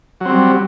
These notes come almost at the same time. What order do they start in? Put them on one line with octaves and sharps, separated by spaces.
F#3 C4 G3